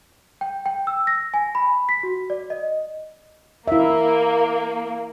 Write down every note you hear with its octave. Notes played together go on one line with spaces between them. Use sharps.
G5
G5
E6
A#6
G#5
B5
B6
F#4
D5
D#5
A#3 E4 E5